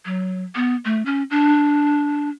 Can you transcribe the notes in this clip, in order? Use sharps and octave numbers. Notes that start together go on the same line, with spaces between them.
F#3
B3
A3
C#4
D4